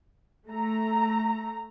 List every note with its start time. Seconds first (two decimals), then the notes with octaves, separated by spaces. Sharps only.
0.49 A3 A#5